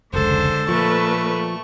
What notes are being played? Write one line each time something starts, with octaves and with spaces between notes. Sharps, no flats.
F1 C#2 D3 G#3 A4 C5
A#2 F3 A3 B4 C#6